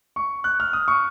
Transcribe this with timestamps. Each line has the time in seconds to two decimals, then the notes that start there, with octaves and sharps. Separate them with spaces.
0.16 C#6
0.44 F#6
0.60 F6
0.73 D#6
0.88 C#6